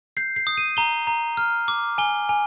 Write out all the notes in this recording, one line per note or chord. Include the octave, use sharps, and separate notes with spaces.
G6 C7
C7
D#6
D#7
A#5 G7
A#5
F6
D6
G#5 G7
G#5